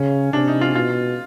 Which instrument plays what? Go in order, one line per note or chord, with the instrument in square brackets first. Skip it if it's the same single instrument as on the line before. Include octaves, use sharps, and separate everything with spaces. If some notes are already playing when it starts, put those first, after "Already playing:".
Already playing: [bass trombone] C#3 [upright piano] C#4
[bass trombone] C3 [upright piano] D4
[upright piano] D#4
F4
[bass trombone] B2 [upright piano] F4